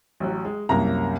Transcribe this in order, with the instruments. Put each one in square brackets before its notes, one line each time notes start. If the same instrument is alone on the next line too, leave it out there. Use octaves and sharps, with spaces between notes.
[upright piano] A1 F#3
G#3
[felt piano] C2 F#2 A#3 [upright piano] A#5